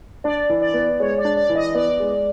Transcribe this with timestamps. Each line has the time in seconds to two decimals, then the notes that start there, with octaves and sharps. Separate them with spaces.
0.24 D4 D5
0.50 E3
0.62 D5
0.74 B3
1.00 G#3 C#5
1.18 D5
1.25 D4
1.37 D5
1.49 E3
1.56 D#5
1.75 B3 D5
2.00 G#3